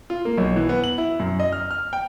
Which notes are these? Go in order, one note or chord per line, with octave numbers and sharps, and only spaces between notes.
F4
A#3
B1
E3
B3
F#7
E4
F#2
D#5
F6
F6
G5